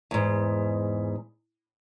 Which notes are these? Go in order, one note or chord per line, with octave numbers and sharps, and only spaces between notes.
E2 G#2